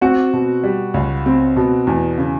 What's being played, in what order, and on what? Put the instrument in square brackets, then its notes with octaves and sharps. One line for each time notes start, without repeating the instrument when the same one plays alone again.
[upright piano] C4 [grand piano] F#4
[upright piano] B2
G3
C#2
C4
B2
E2
C#3